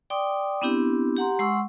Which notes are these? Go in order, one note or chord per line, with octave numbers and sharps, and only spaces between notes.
D5 G5 C6 D6 D#6
B3 C4 D4 E4 G4
G4 F#5 A#5 C6
G#3 F#5 C6 C#6 E6